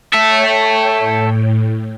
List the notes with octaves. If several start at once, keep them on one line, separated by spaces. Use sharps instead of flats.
A4 C#5 E5 G5
A2